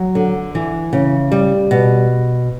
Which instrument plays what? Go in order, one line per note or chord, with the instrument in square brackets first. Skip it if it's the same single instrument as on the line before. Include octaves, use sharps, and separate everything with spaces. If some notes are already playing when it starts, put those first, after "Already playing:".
Already playing: [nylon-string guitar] F#3
D3
E3
C#3
G3
B2